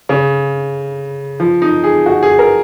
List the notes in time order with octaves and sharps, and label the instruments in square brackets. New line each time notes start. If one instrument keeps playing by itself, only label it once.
[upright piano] C#3
F3
D#4
G#4
F#4
G#4
A#4